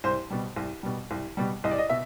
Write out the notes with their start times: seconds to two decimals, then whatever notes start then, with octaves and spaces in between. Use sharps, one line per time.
0.04 C2 C5
0.30 B2 G3
0.56 C2
0.83 B2 G3
1.11 C2
1.37 B2 G3
1.64 C2 D#5
1.71 D5
1.78 D#5
1.90 B2 E5